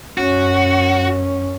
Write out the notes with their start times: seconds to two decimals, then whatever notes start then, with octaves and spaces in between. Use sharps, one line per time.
0.18 F#2 C#4 F#4